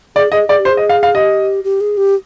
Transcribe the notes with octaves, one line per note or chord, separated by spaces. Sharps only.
G#4 D5
G#4 D#5
G#4 D5
G4
C5
G#4
D#5
F5
F5
G4 D#5
G4
G#4
G4